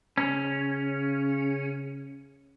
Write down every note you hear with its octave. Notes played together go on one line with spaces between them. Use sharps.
C#3 C#4